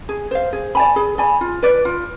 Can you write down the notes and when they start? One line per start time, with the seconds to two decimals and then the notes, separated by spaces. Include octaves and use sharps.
0.09 G#4
0.31 C5 F5
0.53 G#4
0.75 D5 G#5 B5
0.96 G#4
1.18 D5 G#5 B5
1.41 F4
1.62 B4 D5
1.85 F4